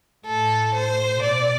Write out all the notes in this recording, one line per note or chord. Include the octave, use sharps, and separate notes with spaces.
A2 A4
C5
B2 D5